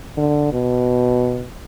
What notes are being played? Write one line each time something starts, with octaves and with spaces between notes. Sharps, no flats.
D3
B2